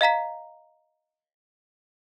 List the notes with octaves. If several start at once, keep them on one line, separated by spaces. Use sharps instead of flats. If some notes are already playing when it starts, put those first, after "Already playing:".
D#5 F5 A#5 B6